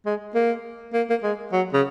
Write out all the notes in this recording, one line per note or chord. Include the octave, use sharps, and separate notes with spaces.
G#3
A#3
A#3
A#3
G#3
F#3
C#3